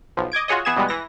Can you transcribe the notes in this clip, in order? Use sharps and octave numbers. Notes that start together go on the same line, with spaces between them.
B1 F3
D#5 D6 G#6 D7
F4 F#4 G#4 C#5 D#5
E3 B3 G#4 G#6 E7
B2 E3 G3 G#3 B3
E3 A#6